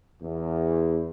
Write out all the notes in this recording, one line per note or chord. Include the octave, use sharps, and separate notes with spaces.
E2